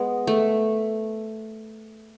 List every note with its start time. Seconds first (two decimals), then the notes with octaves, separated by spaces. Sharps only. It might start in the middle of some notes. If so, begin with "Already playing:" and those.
Already playing: G#3 B3
0.27 A3